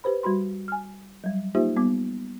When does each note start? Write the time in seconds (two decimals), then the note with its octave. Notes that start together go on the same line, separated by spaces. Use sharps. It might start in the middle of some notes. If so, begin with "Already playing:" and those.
0.04 G4 B4 C5 B5
0.23 G3 F#4 B5 C6
0.68 G#5 F6
1.24 F#3 G3
1.55 A#3 D#4 F4 G4 C5 E5
1.76 G3 B3 D6